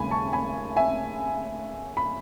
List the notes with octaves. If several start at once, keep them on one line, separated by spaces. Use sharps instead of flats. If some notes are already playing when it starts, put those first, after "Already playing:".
Already playing: D#2 C#3 G#3 G#5 B5
A5 C#6
G#5 B5
E5 G#5
B5